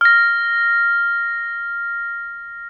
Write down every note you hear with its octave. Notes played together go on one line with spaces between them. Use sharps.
F6 A#6